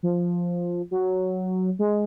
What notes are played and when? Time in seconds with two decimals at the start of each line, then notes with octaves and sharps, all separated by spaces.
0.03 F3
0.91 F#3
1.79 G#3